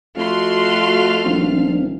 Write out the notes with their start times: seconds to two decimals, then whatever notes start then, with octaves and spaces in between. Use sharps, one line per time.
0.16 F2 A3 F#4 F5 C6
1.25 D#1 F3 C4 D4